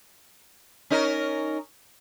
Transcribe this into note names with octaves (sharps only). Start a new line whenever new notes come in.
C#4 D#4 A#4